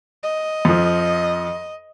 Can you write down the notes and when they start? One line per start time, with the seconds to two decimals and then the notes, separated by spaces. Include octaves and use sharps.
0.23 D#5
0.65 F2 F3